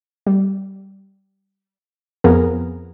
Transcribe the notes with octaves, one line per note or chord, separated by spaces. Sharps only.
G3
F2 F3 B3 G#4 A#4